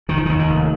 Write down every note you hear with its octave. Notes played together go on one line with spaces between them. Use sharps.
F1 D#3
F3
D#2 D#3
D#3
F1